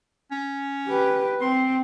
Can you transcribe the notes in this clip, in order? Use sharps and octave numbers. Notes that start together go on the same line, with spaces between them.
C#4
G4 B4
C4 C6